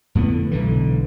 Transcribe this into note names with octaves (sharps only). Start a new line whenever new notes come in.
F2 A2 D3 B3
B1 D3 E3